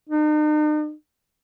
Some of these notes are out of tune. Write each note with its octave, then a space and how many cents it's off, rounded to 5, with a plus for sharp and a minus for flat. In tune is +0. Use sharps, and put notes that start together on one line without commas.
D#4 -45